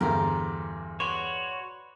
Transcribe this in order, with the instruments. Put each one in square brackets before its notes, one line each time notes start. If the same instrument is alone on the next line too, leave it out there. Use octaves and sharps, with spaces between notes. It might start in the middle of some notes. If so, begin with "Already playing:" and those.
[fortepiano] E2 G2 D3 [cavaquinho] A#4 C5 D5
[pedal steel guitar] F#4 C#5 [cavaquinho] B4 D5 C6